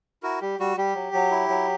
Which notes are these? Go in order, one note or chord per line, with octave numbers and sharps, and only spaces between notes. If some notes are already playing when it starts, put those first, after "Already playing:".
E4 F#4 A#4
G3 G4
G3 F#4
G3 G4
F#3
F#3
E4
F#3